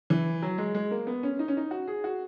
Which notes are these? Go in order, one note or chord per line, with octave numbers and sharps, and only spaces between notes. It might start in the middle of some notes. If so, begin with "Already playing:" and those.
E3
F#3
G#3
G#3
A#3
B3
C#4
D#4
C#4
D#4
F#4
G#4
F#4